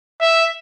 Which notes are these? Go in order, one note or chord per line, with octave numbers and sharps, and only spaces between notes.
E5